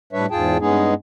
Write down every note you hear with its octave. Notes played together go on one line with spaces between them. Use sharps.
A2 G3 D4 B4 C#5 E5
E2 G#2 F4 G#4 G5 A5
G2 G#3 B3 C#4 D#4 G#4